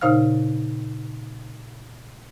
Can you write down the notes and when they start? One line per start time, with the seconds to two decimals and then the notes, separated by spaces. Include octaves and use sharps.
0.01 A#2 C#3 D#4 C5 F5 F6